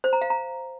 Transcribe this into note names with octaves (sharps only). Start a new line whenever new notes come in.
C5
A#5
F5
A#5